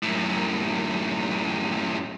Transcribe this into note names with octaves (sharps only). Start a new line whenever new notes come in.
F#2 A2